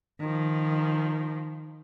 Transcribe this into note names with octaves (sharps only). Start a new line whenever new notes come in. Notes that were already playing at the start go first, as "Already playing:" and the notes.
D#3 F3